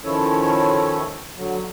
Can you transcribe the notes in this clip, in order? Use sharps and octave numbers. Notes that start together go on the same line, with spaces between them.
D#3 F3 C#4 E4 A4 C#5
D3 F#3